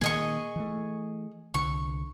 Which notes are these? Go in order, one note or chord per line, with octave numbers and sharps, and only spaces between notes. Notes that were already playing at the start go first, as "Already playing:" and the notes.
A#2 D#3 A#3 G#4 D#5 C#6
E3 A3
C2 D3 C#6